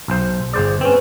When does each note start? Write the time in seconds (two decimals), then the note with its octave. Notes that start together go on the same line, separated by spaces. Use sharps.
0.08 B1 C5
0.53 G1 G#4 C5 D5
0.81 C4 C#4 B4